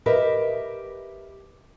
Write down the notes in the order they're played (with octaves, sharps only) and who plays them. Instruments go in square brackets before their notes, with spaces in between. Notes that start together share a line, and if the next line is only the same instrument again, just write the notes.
[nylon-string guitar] G4 A#4 B4 D#5 E5